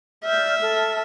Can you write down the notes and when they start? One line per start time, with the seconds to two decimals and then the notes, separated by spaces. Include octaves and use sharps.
0.25 D5 E5 F6 G6
0.61 A4 A5 F6